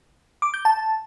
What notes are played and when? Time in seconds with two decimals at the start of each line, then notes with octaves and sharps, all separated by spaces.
0.42 D6
0.54 G6
0.65 A5